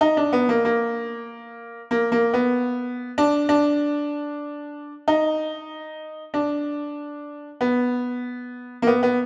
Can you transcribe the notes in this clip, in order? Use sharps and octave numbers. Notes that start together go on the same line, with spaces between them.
D#4
D4
B3
A#3
A#3
A#3
A#3
B3
D4
D4
D#4
D4
B3
A#3
B3
B3